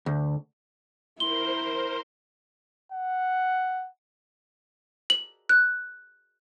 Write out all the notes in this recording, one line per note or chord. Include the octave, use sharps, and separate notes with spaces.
D2
E4 A#4 C5 C6 G7
F#5
F#7
F#6